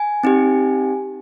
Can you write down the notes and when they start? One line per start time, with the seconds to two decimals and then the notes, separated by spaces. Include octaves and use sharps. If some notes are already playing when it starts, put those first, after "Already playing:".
Already playing: G#5
0.23 C4 D#4 G4